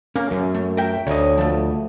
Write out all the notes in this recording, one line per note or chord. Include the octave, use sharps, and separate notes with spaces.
A#3 C#4
F#2
A3
A#4 E5 G5
D2 C#5 D#5
F3 A3